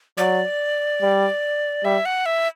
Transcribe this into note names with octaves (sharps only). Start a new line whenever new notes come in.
F#3 D5
G3
G3 E5
F#5
E5